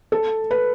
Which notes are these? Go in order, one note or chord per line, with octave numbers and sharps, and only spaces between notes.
A4
B4